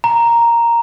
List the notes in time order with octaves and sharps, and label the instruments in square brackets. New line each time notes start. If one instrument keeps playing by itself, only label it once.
[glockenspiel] A#5